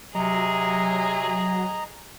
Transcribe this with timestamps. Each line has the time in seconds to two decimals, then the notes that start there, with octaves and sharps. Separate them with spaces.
0.15 C3 F#3 G#4 D#5 A#5